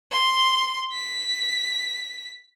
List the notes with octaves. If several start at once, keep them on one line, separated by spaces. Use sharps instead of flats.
C6
B6